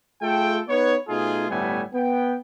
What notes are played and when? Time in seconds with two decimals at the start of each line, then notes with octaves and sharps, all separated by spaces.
0.22 A3 F4 G#4 A4 G5
0.69 B3 D#4 B4 C#5
1.08 B2 A3 D#4 F4 G#4
1.49 G1 A2 G3 A3 B3 G#5
1.94 B3 G5